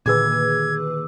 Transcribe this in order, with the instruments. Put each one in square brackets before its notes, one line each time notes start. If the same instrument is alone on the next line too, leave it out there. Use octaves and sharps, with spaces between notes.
[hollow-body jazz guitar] D#2 D3 [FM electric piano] A#2 G#4 B4 [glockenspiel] D6 E6 [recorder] G#6